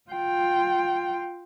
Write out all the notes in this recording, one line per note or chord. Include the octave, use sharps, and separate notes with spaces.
F4 G5